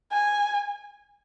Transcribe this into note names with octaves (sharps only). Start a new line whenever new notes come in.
G#5